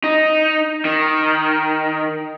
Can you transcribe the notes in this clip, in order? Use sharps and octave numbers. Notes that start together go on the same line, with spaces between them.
D#4
D#3